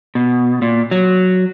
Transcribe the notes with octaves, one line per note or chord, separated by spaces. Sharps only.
B2
A#2
F#3